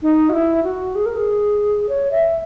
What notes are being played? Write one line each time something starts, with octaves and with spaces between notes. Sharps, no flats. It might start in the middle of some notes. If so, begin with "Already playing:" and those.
D#4
F#4
E4
F#4
G#4
A#4
G#4
C#5
E5